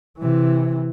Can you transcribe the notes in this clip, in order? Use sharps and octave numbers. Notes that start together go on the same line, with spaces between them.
C3 E3